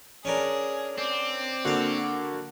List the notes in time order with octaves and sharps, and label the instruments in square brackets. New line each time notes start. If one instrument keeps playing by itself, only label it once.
[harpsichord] C#4 D4 A#4 [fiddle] G#4
[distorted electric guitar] C4 [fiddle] D5
[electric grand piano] D3 A#3 F#4 [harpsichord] F5 F#5